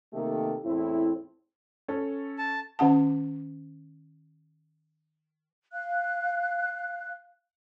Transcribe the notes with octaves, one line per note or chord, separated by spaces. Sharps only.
C3 D#3 A3 A#3 G4 A4
E2 A2 C4 E4
C#4 A4
A5
D#3 C#4 F#5 A5
F5 F#6